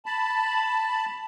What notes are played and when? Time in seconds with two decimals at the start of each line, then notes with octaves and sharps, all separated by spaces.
0.06 A5 B5